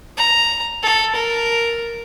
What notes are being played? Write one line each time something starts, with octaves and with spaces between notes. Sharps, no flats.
A#5
A4
A#4